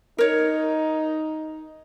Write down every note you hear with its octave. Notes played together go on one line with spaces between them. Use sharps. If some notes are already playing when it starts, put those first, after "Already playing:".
D#4 A#4 C#5